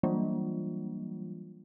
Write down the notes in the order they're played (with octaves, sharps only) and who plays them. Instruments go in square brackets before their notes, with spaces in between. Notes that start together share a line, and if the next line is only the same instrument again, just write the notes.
[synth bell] E3 F#3 G3 A#3 D4 F4